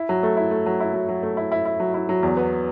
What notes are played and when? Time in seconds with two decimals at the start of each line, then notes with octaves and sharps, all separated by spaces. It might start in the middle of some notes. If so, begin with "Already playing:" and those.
Already playing: E4
0.09 F#3
0.23 A3
0.37 E4
0.51 A3
0.66 F#3
0.80 E4
0.94 F#3
1.09 F#3
1.23 A3
1.37 E4
1.52 E4
1.65 E4
1.80 F#3
1.94 E4
2.09 F#3
2.23 E2
2.37 B3